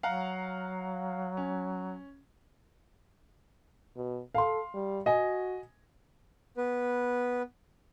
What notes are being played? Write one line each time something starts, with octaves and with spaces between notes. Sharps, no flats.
F#3 F5 F#5 A#5
C#4
B2
A4 F5 C6
G3
F#4 D#5 G#5
B3 B4